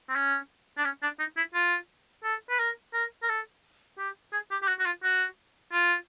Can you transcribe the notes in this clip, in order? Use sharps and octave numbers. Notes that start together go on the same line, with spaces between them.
C4
C#4
D4
C#4
D4
D#4
E4
F4
A4
B4
A#4
A#4
A#4
A4
G4
G#4
G4
G4
F#4
F#4
F4
F#4
F4